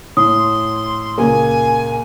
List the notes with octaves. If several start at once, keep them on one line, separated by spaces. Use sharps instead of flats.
A2 C6 D#6
C#2 A#2 A#3 G#5